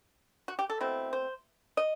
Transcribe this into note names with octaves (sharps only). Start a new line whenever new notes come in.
F#4
G4
A4
B2 A3 C4 E4
C5
D#5